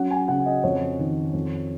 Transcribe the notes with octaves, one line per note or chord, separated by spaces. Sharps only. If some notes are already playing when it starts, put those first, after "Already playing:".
Already playing: F#3 C#4 F#5
G#5
C#3 F#5
D#5
F2 C#5
D#3
F2